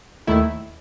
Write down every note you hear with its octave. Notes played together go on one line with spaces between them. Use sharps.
D#2 D#3 A3 E4